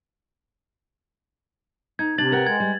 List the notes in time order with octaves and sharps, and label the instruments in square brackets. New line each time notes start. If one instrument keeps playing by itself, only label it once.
[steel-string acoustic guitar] D#4 [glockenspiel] G#6
[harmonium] C3 [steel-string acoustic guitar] D4 [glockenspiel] A6 F#7
[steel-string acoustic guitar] A#4 F#5 G5
[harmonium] G#3 [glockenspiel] G#6
[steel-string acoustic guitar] G3